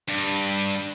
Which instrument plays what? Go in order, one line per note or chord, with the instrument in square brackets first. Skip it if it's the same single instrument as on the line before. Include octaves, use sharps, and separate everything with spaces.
[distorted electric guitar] G2